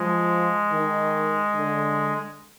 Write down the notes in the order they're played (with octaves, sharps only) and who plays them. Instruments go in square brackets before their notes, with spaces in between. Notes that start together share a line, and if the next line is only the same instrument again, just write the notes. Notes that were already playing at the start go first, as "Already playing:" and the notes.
Already playing: [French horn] F3 [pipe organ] G#3
[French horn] D#3
D3